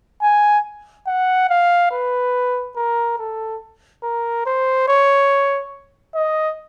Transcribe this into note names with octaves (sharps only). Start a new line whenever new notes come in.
G#5
F#5
F5
B4
A#4
A4
A#4
C5
C#5
D#5